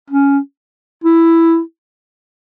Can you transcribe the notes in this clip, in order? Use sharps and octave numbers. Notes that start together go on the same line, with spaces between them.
C#4
E4